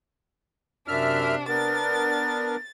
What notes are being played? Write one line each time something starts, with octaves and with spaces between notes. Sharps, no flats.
F#2 C3 D4 E5 F6
B3 D4 A#4 A6